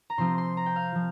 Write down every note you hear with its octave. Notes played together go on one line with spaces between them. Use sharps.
A#5
C3 F3 C4 F4 C6
C6
A#5
G5
F5
F3